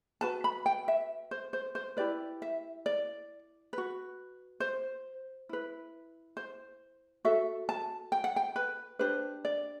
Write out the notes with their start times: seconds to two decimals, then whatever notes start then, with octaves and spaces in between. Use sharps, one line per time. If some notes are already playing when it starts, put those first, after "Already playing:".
0.21 F#4 B4 A5
0.44 B5
0.66 G5
0.88 E5
1.31 C5
1.53 C5
1.75 C5
1.97 E4 G4 B4 D5
2.42 E5
2.86 D5
3.73 F#4 B4
4.60 C5
5.49 E4 B4
6.37 C5
7.25 F#4 A4 E5
7.69 A5
8.12 G5
8.24 F#5
8.36 G5
8.56 B4
8.99 D4 G4 B4 C5
9.45 D5